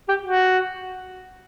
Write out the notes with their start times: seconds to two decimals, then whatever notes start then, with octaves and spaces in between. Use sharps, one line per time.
0.09 G4
0.23 F#4